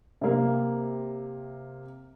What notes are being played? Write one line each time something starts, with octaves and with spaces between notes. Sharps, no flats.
C3 A#3